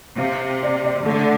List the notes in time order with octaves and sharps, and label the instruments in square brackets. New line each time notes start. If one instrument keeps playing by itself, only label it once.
[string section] C3 [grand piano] F5
[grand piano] F5
D5
D5
[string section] D3 [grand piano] A3